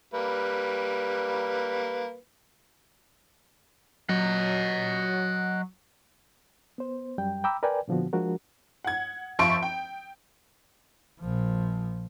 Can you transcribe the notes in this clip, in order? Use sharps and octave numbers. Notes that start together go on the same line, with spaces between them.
G3 A#3 B4
F#3 D#5 F#5
B3 C5
F#2 G3 G5
G5 A#5 B5 D6 E6
A#4 B4 D5 G5 G#5
A#2 D3 F3 B3 F#4
F3 G#3 D4 F#4 A#4
F#5 G#6
F1 F3 E5 C6 C#6 D7
G5
A#1 F3